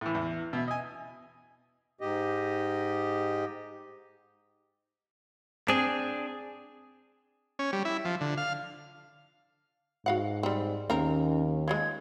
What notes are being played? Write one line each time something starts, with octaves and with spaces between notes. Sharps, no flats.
A2 E3
E2
B2 E5
D#5 G#5
G#2 G4 D#5
C4 D4 G#4
C#4
G3
E4
F3
D3
F5
G#2 F#4 F5 F#5
G3 C4
D#2 A#3 C4 C#4 A#4
F3 F#3 G#3 G#6